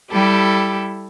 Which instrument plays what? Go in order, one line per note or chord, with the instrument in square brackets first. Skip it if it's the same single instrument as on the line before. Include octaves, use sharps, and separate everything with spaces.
[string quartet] G3 E4 G4 A4